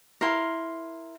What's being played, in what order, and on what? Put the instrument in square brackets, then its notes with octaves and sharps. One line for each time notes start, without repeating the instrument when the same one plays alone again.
[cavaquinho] E4 A#4 F5 C6